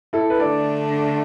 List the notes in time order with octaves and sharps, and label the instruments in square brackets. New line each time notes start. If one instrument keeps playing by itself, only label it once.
[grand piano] E4 A4
B4
[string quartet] D3 A3 D4 [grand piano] A4 D5